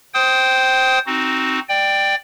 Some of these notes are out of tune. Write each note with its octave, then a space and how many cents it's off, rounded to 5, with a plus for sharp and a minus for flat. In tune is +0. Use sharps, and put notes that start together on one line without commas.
C5 +0 G5 -15 D#6 +20
C4 +0 D#4 +0 F#4 +10
D5 +15 G5 +0